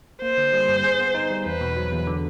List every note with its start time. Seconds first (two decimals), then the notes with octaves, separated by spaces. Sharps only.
0.22 A#3 C5
0.38 D3
0.53 G3
0.69 G2
0.84 G#4
0.99 B3
1.15 D#4
1.30 G3
1.46 E2 B4
1.61 B2
1.77 F#3
1.92 E2
2.07 D3